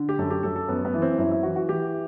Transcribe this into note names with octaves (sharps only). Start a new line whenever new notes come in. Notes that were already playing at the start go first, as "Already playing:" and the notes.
Already playing: D3
G4
F#2 A4
G4
F#2 A4
A4
F#2 B3
B3
E3
C4
F#2 E4
E4
E3 F#4
F#4
E3 G4